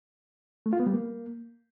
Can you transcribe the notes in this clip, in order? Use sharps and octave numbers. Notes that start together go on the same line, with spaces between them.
A3
F4
B3
G3
A#3